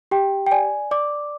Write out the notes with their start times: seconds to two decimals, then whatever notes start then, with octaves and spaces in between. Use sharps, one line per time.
0.11 G4 G5
0.47 G5
0.52 D5 G#5
0.91 D5 D6